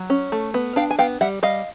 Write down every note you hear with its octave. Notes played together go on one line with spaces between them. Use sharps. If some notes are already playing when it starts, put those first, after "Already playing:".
Already playing: F#3
C#4
A3
B3
D4 F5 G5
G#5
B3 F5 G5
G3 E5 F#5
G3 D#5 F5